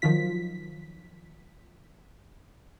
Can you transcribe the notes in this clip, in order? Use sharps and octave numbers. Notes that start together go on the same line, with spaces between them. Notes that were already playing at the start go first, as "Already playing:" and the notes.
D#3 F3 F#3 F4 B6